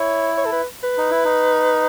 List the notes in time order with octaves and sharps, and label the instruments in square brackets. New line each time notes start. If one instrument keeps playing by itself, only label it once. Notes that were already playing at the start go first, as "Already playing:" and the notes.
Already playing: [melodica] E4 [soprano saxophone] C#5
[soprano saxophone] C#5
A4
B4
B4
[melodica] D#4
E4
D#4